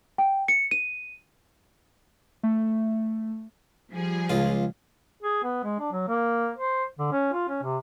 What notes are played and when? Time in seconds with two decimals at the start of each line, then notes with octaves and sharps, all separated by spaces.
0.18 G5
0.48 C#7
0.71 D#7
2.43 A3
3.91 F3 G3 G#4
4.30 C#2 F4
5.23 G#4
5.44 B3
5.64 G#3
5.79 D4
5.92 F#3
6.08 A#3
6.58 C5
6.99 D3
7.12 C#4
7.33 F4
7.49 C#4
7.63 C3